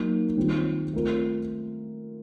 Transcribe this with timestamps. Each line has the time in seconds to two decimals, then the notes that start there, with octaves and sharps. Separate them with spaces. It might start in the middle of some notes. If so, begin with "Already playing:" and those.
Already playing: F#3 A#3 D#4
0.37 D#3 G3 C4 F4
0.93 A3 C4 F4 A#4